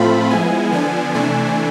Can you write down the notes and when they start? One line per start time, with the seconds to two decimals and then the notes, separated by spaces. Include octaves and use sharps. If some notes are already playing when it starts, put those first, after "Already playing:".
Already playing: A2 F3 A3 C4 F4 B5
0.30 F3 G#3 B3 E4 G#5
0.72 D3 F3 B3 D4 G#5
1.15 C3 E3 A3 D4 G#5